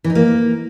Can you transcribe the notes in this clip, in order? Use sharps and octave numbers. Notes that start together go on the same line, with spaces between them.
E3
D#4
A#3